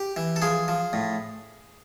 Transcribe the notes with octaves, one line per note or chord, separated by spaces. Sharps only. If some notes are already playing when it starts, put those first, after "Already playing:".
Already playing: G4
E3
A4
F3 G#4
F3
A2